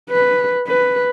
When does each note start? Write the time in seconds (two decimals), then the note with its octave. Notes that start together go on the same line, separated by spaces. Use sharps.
0.10 B4
0.68 B4